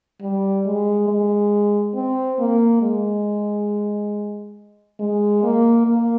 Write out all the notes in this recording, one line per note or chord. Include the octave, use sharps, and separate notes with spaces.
G3
G#3
G#3
C4
A#3
G#3
G#3
A#3
A#3